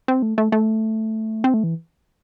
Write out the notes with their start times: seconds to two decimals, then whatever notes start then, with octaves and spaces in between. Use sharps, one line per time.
0.08 C4
0.22 A3
0.38 A3
0.52 A3
1.44 C4
1.54 A3
1.64 E3